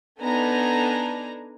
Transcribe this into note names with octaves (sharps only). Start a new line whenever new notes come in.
B3 D4 D#4 A4 G#5 A#5